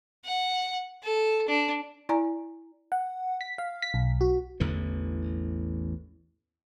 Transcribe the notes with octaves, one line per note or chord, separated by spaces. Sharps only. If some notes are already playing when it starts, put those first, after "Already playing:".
F#5
A4
D4
E4 D5 G#5 A#5
F#5
B6
F5
B6
B1
F#4
A1 E2 D3 E3